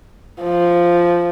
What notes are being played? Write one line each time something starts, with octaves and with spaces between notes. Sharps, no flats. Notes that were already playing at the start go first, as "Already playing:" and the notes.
F3